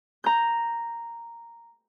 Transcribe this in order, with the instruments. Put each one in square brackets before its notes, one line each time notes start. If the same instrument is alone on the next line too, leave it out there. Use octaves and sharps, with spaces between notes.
[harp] A#5 G6